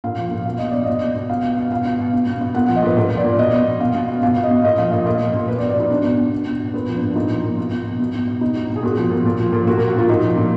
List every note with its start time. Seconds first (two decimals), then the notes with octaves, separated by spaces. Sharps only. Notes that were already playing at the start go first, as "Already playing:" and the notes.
0.04 A#2 F5
0.17 F3
0.31 A#2
0.45 B2 F5
0.58 B2 D#5
0.71 B2 D5
0.83 B2 D#5
1.02 B2
1.15 B2
1.30 B2 F5
1.43 B2
1.57 B2
1.71 B2 F5
1.85 B2
1.99 B2
2.13 B2
2.27 B2
2.41 B2
2.55 A#2 F#5
2.66 F#5
2.69 F3
2.76 D#5
2.83 A#2 B4
2.97 A#2 B4
3.11 F3
3.17 D5
3.24 A#2
3.38 B2 D#5
3.53 B2
3.67 B2
3.80 B2 F5
3.95 B2
4.08 B2
4.23 B2 F5
4.36 B2
4.43 D#5
4.51 B2
4.64 A#2 D#5
4.78 F3 F5
4.91 A#2 D#5
5.06 A#2 D#5
5.21 F3
5.34 A#2
5.48 B2 B4
5.58 D5
5.62 B2
5.69 D5
5.76 B2 D#4
5.90 B2 D4
6.04 B2
6.18 B2
6.33 B2
6.47 B2
6.60 B2
6.74 A#2 B3
6.88 F3
6.95 D4
7.02 A#2
7.16 A#2 D#4
7.30 F3
7.44 A#2
7.58 B2
7.71 B2
7.86 B2
8.00 B2
8.14 B2
8.27 B2
8.41 B2 D#4
8.56 B2
8.70 B2
8.76 G#4
8.83 A#2 F#4
8.97 F3
9.11 A#2
9.25 A#2
9.39 F3
9.53 A#2
9.67 A#2 F#4
9.77 A#4
9.81 F3
9.88 F#4
9.96 A#2 F4
10.09 A#2 D#4
10.23 F3
10.37 A#2